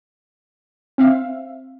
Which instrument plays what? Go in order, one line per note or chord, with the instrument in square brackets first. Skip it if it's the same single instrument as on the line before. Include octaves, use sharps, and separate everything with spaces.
[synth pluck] C4 E5 F5